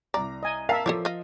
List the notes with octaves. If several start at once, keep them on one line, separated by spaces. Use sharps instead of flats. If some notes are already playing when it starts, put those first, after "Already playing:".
C2 D5 A#5
D#5 G#5
A#4 E5 F5 A5 C7
F3 A4 C#5 D5
D#5 F5